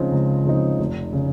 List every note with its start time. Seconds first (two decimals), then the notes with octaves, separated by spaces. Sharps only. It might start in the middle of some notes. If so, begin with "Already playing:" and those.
Already playing: C#2 C#3 F3 C4 D#4
0.12 C#2
0.45 C#3 F3 C4 D#4
0.79 F1
1.13 C#3